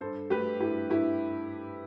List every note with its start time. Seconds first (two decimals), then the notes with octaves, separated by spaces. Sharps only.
0.01 G2 A4 C5
0.30 A3 G4 B4
0.60 G2 E4 G4
0.90 G2 E4 G4